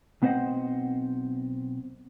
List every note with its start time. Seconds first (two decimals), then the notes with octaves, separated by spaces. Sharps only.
0.22 B1 B3 C4 C5 D#5 F#5